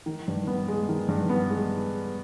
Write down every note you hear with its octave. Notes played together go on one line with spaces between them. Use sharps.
D#3
G2
B3
G#3
D#3
G2
B3
G#3